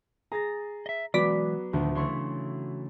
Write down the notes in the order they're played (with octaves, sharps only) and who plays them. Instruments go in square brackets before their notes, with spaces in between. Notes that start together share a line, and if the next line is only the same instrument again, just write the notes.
[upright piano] G#4 [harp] A#5 A6 A#6
[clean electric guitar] D#5 E5
[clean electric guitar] E3 G#3 [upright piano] F#3 [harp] B3 F#4 [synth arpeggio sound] D5 D6 B6
[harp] D2 [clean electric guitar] A2 D#3 F3
[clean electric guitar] C#3 E3 A3 [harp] C#5 C6 C#6